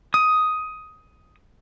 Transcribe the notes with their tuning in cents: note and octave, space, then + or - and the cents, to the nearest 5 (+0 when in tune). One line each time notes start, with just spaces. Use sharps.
D#6 +10